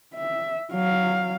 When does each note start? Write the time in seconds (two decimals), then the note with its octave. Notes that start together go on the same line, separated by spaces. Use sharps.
0.15 E5
0.73 F#3 F5